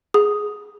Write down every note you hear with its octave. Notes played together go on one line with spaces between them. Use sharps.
G#4